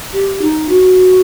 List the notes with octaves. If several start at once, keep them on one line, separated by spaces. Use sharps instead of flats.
G4
D#4
F#4